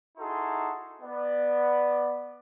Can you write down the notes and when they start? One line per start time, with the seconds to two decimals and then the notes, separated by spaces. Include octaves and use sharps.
0.18 D#4 E4 F#4 G#4 A4 C6
1.00 B3 D5